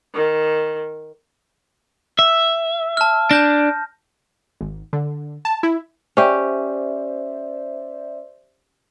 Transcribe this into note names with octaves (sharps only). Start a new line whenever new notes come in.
D#3
E5
A5 F6
D4 A5 G6 A#6
G#1
D3
A5
E4
C#4 G4 C5 D5 E5